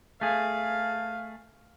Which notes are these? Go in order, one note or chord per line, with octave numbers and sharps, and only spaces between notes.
A3 G#4 F5